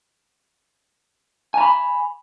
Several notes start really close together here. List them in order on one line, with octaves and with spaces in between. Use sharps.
G#5 A#5 B5